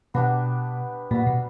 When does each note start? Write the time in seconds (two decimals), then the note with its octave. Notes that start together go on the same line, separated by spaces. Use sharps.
0.14 B2 B3 D4 G4
1.11 A#2 G3 B3 F#4
1.27 B2